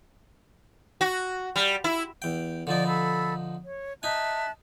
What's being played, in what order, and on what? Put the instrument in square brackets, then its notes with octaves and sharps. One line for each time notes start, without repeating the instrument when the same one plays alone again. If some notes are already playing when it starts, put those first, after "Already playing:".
[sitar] F#4
G3
E4
[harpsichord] E2 G5
[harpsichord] D3 F3 D#4 [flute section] D5
[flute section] A4 B5 E6
C#5
[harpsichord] D#4 G#5 [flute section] E5 A5 F#6